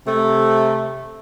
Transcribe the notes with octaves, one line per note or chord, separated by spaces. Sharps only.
C3 A3